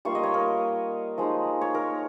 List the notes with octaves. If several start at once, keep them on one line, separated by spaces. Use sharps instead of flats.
G3 A#3 F4 C#6
D#5
C#5
A#4
F3 G#3 D#4
C#5
A#4